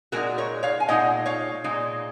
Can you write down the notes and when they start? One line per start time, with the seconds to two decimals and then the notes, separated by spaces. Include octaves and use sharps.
0.12 A#2 G#3 D#4 F#4 A#4
0.38 A#4 C#5
0.63 C#5 F5
0.80 G#5
0.89 A#2 G#3 D#4 D#5 F#5
1.26 C#5 F5
1.64 A#2 G#3 D#4